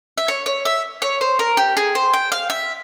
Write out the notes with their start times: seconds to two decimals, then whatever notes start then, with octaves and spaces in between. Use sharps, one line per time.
0.18 E5
0.28 C#5
0.46 C#5
0.65 E5
1.02 C#5
1.21 C5
1.39 A#4
1.57 G4
1.77 G#4
1.95 C5
2.13 G5
2.32 F5
2.50 E5